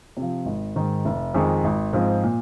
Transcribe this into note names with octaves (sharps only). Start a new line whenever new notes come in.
C3 F3
G#1
G#2 D#3
F1
F2 D#3 G#3
G#1
G#2 F3 C4 G#4
A#2